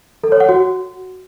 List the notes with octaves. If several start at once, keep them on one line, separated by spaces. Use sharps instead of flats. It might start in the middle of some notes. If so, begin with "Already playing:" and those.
A4
C#5
F#5
F#4